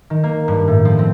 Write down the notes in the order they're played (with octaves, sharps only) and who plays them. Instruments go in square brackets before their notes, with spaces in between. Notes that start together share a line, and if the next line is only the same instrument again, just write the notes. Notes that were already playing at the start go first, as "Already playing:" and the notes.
[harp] D#3
A#3
G2
A2
F3
C4